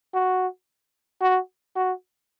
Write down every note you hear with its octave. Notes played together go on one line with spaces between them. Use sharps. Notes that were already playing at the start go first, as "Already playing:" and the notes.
F#4
F#4
F#4